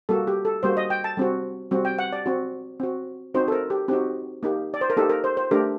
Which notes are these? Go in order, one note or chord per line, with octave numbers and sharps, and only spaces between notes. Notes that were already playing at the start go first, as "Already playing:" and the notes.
G3 A#3 F#4 A4
G4
A4
G3 A#3 F#4 C5
D#5
G5
A5
G3 C4 F#4
G3 C4 F#4
G5
F#5
D5
C4 F#4
C4 F#4
C4 D#4 F#4 C5
A4
A#4
G4
C4 D#4 F#4 G4
A#3 D#4 G4
D5
C5
A#4
A#3 D#4 G4 A4
A#4
C5
C5
A3 D4 G4 A#4